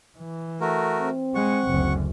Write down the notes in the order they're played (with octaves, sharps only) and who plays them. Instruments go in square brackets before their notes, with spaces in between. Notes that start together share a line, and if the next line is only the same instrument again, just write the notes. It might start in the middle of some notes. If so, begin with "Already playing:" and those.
[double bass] E3
[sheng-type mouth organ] A3 F#4 A#4
[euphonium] C4
[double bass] G#3 [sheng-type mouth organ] F#5 C#6
[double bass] F#1 D2